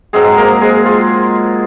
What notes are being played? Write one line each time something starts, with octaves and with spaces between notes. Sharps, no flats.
G#2 F#3 G#3 C4 G#4
A#3 A#4
G#3 G#4
F4